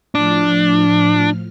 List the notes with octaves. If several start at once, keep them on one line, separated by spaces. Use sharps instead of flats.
A2 F3 D4 F6